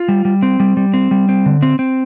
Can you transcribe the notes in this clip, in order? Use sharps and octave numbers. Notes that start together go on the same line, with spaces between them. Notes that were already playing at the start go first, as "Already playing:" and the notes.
Already playing: F4
G3
G3
C4
G3
G3
C4
G3
C4
D3
C4
C4